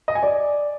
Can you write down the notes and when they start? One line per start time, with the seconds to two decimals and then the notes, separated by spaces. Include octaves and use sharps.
0.08 D#5
0.15 G#5
0.23 D5